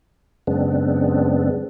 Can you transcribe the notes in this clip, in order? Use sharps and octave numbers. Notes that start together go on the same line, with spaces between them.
F#2 C#3 G#3 B3 C4 D4